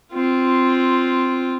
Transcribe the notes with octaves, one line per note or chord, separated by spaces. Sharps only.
C4 F4